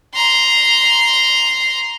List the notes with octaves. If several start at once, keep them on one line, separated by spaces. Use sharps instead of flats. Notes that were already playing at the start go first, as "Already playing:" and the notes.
A#5 C6